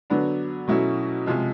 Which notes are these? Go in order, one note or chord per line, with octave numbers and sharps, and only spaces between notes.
D3 F#3 B3 D4
B2 F#3 A3 C#4 E4
C3 F3 G#3